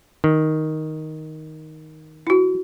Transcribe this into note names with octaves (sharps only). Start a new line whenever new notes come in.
D#3
E4 F#4